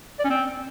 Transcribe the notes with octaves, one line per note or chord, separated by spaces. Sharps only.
D5
C#4
C4